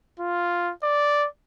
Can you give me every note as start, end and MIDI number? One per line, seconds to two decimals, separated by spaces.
0.19 0.72 65
0.83 1.27 74